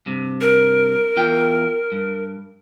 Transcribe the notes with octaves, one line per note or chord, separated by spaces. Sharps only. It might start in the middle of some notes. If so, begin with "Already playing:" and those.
G2 C3
A#4
E2 F4 G5
G2